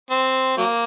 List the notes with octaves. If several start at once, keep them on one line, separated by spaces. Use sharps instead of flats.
C4
F#3 A#3